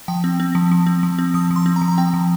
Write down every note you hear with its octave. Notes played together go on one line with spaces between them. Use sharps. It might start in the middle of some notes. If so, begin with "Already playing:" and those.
F3 G5
C4
C4
F3
F3
C4
F3
C4
F3 D#6
F3
C6
C4
A#5
F3
A#5
C4 G5
F3